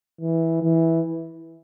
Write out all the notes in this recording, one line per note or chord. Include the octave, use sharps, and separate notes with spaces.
E3
E3